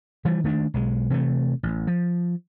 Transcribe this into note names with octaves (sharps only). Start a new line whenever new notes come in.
E3 F3 G3
D#3 A3 C#4 D4
B1 G#3
C3 E3 G3 A3
A1
F3